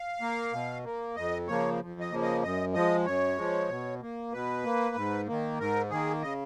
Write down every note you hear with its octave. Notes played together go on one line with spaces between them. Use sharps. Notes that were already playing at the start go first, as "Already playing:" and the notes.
Already playing: F5
A#3
B2
A#3
F2 D#5
C#3 F3 A#3 C#5
F2
D#5
C#3 F3 A#3
D#5
F#2 D#5
F3 G#3 D#5
F#2 C#5
F3 G#3
B2
A#3
B2 B4
A#3
G#2
D#3 A#3
G#2 A#4
D#3 A#3 G#4
C#3 D#5